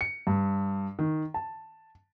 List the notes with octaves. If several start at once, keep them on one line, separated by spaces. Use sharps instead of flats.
C#7
G2
D#3
A5